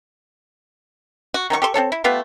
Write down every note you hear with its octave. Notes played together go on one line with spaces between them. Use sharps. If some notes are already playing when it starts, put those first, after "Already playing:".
F#4
D#3 F#3 F#4 C#6
G4 A4 C6 C#6
C4 F4 A4 C#5
E4
A3 B3 F4 G4